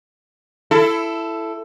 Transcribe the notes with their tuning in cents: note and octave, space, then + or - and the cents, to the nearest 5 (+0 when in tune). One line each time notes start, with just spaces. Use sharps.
E4 +15 A4 +0